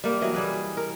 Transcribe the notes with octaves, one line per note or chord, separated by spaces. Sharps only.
G3 A#3
E3 F#3 D#5
G3 G#4 B4
A#4